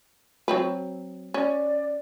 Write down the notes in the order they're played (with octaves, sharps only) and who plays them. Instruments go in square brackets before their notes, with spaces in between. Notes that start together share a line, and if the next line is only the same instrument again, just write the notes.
[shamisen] F#3 C4 B4
[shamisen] C#4 [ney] D5